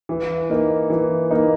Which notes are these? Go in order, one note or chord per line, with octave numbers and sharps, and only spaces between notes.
E3
A#3 D#4
E3
A#3 D#4